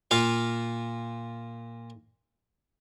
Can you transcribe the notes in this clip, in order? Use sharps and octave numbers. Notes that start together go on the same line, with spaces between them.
A#2 F4 F5